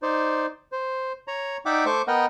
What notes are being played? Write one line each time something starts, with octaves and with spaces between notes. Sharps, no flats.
D#4 C5 D5
C5
C#5 A#5
D#4 D5 E5 F#5 G5 D6
A3 C5 C#6 D6
B3 A#4 D#5 F#5 G5